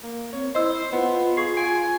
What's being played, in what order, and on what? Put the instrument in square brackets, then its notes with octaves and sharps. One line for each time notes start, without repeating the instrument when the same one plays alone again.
[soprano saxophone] A#3
[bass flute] C4 [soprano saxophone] C#5
[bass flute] E4 [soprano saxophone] C5 [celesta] D#5 E6
[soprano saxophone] B3 [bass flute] F4
[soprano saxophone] G#4 [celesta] C#6 C7
[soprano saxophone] G#5 [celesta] D7